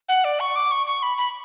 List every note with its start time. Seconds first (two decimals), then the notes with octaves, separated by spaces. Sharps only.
0.09 F#5
0.24 D5
0.40 C#6
0.56 D6
0.71 C#6
0.86 C#6
1.03 B5
1.18 B5